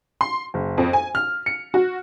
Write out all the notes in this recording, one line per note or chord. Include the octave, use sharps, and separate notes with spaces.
C6
F#1
F2
G#5
F6
C#7
F#4